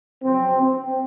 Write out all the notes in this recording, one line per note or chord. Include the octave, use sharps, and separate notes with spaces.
F2 C#3 F#3 C4
C4